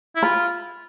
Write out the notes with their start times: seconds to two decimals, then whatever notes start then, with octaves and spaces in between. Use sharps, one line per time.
0.16 E4
0.23 F4 B5